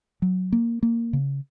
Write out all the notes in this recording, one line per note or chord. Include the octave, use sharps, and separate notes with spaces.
F#3
A#3
A#3
C#3